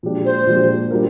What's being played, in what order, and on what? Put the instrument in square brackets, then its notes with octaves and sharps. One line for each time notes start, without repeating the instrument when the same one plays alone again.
[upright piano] A#2 F3 G#3 D4 G4
[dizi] C5
[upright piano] A#2 F3 G#3 D4 G4
G3 D4 F4 A#4